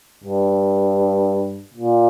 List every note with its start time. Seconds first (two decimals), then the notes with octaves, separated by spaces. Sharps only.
0.24 G2
1.74 A#2